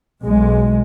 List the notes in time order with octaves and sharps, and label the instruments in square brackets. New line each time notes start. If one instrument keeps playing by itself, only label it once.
[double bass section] B1 G#3